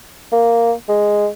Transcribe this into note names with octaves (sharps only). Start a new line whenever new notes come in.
A#3
G#3